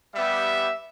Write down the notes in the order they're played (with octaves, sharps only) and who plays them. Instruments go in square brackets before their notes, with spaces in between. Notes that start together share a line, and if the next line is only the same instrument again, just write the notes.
[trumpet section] G3 B3 G4 E5